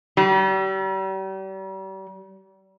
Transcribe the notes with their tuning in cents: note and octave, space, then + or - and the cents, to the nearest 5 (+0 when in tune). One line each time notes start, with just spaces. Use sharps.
G3 -40